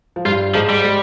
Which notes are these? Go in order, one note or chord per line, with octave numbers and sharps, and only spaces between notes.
F3
G2 G3 F4
G#2 F3 G#3
G3
G#3